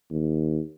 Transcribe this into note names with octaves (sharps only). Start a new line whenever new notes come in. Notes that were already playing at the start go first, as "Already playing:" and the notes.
D#2